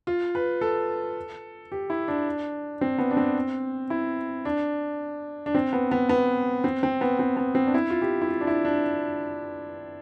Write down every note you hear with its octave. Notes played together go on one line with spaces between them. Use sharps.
F4
B4
A4
G4
E4
D4
C4
B3
D4
C4
E4
D4
D4
C4
B3
B3
B3
C4
C4
B3
C4
B3
C4
D4
E4
F4
G4
E4
F4
D4
E4
D4